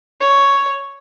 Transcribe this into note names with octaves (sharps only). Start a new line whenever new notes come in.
C#5